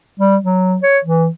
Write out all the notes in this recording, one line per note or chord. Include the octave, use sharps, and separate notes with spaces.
G3
F#3
C#5
E3